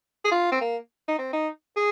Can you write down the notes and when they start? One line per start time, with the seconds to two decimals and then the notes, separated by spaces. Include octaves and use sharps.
0.25 G#4
0.31 F4
0.51 C4
0.61 A#3
1.08 D#4
1.18 C4
1.33 D#4
1.76 G#4